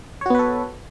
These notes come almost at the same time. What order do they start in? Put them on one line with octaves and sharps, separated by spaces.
C#5 F#4 B3 B4 A4